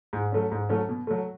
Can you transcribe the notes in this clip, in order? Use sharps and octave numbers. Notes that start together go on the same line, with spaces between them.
G#2
F#3 A3 C#4
G#2
F#3 A3 C#4
B2
F#3 A3